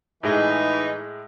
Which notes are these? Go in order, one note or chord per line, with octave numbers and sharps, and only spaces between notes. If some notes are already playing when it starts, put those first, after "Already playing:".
A2 E3 G#3 D#4 G#4